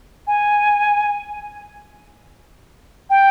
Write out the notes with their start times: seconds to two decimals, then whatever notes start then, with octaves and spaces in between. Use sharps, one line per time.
0.27 G#5
3.10 G5